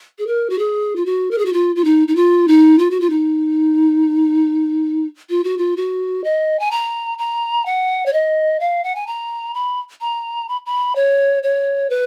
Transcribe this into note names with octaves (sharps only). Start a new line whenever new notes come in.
G#4
A#4
F#4
G#4
F4
F#4
A#4
G#4
F#4
F4
F4
D#4
D#4
F4
D#4
F4
F#4
F4
D#4
F4
F#4
F4
F#4
D#5
G#5
A#5
A#5
F#5
C#5
D#5
F5
F#5
G#5
A#5
B5
A#5
B5
B5
C#5
C#5
B4